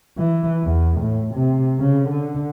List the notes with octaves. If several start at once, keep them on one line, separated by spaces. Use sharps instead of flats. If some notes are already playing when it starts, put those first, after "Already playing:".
E3
E2
A2
C3
C#3
D3